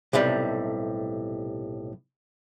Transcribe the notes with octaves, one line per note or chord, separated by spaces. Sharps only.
B1 A2 C3 G3